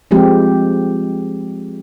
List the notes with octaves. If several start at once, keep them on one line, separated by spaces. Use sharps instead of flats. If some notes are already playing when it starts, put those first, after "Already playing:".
F3 G#3 C4 G4